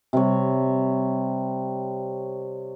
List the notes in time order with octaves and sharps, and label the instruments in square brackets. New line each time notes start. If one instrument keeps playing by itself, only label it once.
[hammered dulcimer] C3 G3 C#5